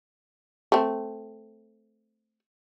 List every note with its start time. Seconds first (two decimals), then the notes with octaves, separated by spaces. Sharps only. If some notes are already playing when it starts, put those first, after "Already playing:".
0.72 A3 C4